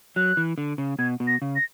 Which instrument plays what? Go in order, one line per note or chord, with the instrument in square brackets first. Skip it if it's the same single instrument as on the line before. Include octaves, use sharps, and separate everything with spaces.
[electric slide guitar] F#3 [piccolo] F#6
[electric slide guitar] E3
D3
C#3
[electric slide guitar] B2 [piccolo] G#6
[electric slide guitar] B2
[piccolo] A#6
[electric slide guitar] C#3
[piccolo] A#6